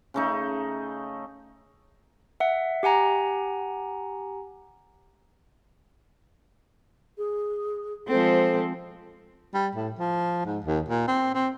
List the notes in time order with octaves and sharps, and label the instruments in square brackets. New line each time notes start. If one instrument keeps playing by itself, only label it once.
[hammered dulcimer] C#3 A3 D#4
[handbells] E5 F#5
G4 F#5 G#5 A#5
[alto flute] G#4
[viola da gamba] F3 G#3 C4 [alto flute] A4
[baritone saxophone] G3
A2
F3
G#2
D#2
A#2
C4
C4